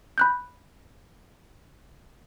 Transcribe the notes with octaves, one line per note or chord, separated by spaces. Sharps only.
B5 F#6 G6